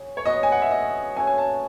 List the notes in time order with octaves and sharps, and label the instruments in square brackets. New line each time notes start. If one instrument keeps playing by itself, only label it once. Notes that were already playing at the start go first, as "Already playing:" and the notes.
Already playing: [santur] F#3 C#4 G#4
[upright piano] C#5
[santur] F#3 B3 F#4 B4 [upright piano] D#5
[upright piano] G#5
F#5
E5
D#5
[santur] A3 C#4 F#4 C#5 [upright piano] G#5
[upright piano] G#5
A5